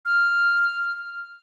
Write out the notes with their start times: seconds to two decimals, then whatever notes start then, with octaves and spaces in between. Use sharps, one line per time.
0.05 F6